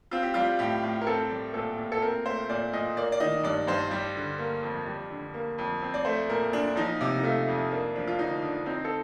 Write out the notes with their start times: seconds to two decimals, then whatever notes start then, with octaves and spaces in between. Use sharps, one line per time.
0.11 C4 F4
0.23 G4
0.34 G3 F4
0.59 A2 G4
0.83 A2
1.01 A#4
1.07 C4 A4
1.30 G3
1.54 A#2 A4
1.78 A#2
1.92 A4
2.02 C4 A#4
2.26 A3 C5
2.50 A#2 D5
2.73 A#2 D#5
2.97 A#3 D5
3.12 D5
3.20 D#3 D#5
3.44 G2 D5
3.67 G2 C5
3.91 G3
4.16 D3
4.39 A#3
4.62 F2
4.86 G3
5.11 D3
5.34 A#3
5.58 F2
5.82 C4
5.94 D5
6.05 A3 C5
6.29 A#2 A#4
6.52 A#2 D4
6.76 F3 D#4
7.01 C3
7.18 D#4
7.23 A3 F4
7.48 F2
7.71 A#3 D4
7.95 F3 D4
8.07 F4
8.18 D3 D#4
8.42 D3 D4
8.66 C4 D#4
8.85 A4